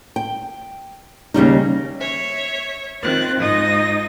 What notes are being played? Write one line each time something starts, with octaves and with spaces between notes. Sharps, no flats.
G5
D#2 C#3 G3 D#4
C#5 E5
D#3 C4 F4 F#6 A6
G#2 D#4 F4 D#5 D#6 A#6